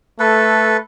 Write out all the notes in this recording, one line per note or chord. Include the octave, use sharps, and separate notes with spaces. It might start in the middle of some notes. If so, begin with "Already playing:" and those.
A3 A4 B4